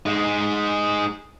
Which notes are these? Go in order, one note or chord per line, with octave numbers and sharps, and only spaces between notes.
G#3 D#4